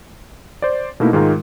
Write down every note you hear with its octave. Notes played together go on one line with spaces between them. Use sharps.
C5 D5
B2 A3 A#3 D#4 E4
G#2 D#3 G#3 F4 A#4